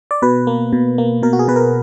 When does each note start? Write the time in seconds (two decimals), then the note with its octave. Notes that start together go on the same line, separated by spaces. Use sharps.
0.11 D5
0.22 B2 B4
0.47 A#3
0.73 B2
0.98 A#3
1.23 B2 A#4
1.33 F#4
1.39 G#4
1.48 B2 B4
1.56 A#4